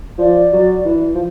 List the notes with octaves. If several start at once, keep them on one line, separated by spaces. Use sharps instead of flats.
F3 D5
F#3
E3
F3